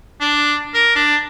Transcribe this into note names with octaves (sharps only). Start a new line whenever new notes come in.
D4
A#4
D4